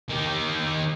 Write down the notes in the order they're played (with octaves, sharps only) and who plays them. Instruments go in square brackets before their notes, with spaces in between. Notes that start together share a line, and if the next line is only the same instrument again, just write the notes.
[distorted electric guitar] D#3 G4